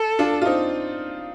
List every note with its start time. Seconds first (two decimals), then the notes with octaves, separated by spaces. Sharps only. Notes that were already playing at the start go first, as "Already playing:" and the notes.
Already playing: A4
0.19 D4 F4
0.42 F4
0.45 C4 D#4